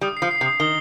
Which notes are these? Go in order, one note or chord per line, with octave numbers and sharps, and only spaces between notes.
G3 D#6
C7
F3
C7
C3
D#6
D#3 G7